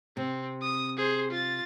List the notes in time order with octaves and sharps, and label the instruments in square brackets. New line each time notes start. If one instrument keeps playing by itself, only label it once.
[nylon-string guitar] C3 [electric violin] C4
[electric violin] D#6
G#4 C5
F4 A6